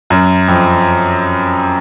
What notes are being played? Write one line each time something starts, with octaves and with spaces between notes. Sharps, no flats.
F#2
F2